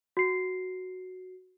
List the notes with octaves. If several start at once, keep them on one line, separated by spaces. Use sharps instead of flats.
F#4 C7